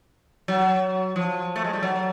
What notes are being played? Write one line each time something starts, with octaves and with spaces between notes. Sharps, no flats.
F#3
F3
A3
G#3
G3
F#3